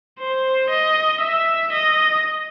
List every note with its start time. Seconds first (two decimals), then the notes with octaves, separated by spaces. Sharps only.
0.19 C5
0.70 D#5
1.21 E5
1.72 D#5